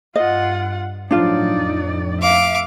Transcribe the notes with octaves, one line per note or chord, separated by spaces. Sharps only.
G2 F4 D#5 F#5
A2 F3 F#3 D4 D#4 F4 D5
F2 A2
E5 F5 D6